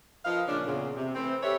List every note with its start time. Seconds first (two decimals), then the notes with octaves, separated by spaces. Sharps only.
0.25 F3 A#4 B4 D#5 F5
0.47 A#2 C#3 F3 C#4 D4
0.66 E2 A#2 C#3
0.95 C3
1.14 E3 A3 C4
1.41 G4 A4 B4 C#5 E5